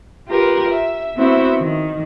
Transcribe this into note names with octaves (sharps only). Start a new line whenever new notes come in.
F4 G4 A#4 B4
E5
B3 C4 E4 F#4 C5 E5
D#3